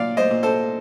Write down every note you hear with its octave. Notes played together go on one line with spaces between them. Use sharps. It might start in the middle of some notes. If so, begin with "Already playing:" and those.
Already playing: A#2 D5 F5
C5 D#5
A#2
A4 C5